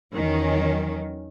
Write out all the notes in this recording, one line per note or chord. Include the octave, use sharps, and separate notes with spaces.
E2 D#3 F#3 C#4